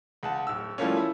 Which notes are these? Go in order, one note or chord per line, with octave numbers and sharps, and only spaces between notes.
C#2 F#5 A5
D1 E6
E3 F3 G3 A3 A#3 C#4
E4